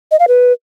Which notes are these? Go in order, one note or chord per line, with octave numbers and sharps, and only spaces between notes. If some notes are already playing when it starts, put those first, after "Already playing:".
D#5
F5
B4